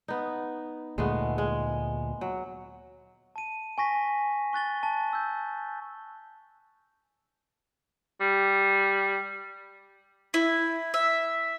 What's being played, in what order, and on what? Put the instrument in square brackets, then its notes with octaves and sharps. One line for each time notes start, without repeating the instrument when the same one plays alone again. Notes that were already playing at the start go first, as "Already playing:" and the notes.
[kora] B3 D#4
[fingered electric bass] D2 A#2 [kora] G#3 A3 B3
[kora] G#3
F#3
[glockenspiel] A5 D#7
G#5 C#6 A#6 B6
C#6 F#6 A6 G7
A5
E6 G6
[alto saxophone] G3
[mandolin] E4
E5